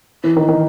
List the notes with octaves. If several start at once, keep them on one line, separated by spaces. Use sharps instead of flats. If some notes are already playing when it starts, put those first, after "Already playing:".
E3
D#3
D#3